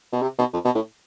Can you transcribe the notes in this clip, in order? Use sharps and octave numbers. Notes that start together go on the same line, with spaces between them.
B2
C3
B2
F2
B2
A2